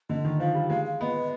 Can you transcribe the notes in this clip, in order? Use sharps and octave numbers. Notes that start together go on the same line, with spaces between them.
D3 D#5
D#3
F3 F5
G3
G#3 F5
F5
B3 D#5